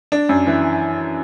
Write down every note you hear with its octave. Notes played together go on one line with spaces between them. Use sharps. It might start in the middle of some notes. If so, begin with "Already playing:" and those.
D4
F#2
E3